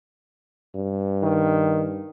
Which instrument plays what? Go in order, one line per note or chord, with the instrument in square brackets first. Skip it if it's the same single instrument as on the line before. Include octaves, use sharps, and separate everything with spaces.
[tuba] G2
[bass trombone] D#3